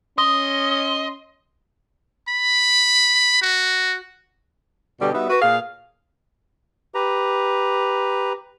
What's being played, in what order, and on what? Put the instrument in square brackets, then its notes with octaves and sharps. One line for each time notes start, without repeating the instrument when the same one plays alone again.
[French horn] C#4 [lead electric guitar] D#5 [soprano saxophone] C6 [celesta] D#6
[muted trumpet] B5
F#4
[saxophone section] B2 D3 G3 G4
G3 B3 D#4 F#4 E5
F#4 B4
A#2 G#4 F5
[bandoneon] G4 B4 A#5